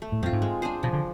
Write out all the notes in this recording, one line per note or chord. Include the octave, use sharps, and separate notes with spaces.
A3
A2
F2 C4 F4
G#2
G#3
D4 G#4 C5
B2 F3
D3